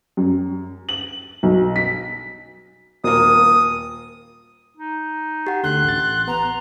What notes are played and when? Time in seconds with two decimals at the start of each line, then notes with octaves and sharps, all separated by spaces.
0.17 F#2
0.89 F#7
1.43 B1
1.76 B6
3.04 D#1 A#3 D#6
4.77 D#4
5.47 G4 F#5
5.64 D2 D3 C6 F#6
5.84 A1 A6
6.28 B3 A#5